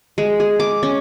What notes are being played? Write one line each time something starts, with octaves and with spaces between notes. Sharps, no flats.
G#3
G#4
D6
C#4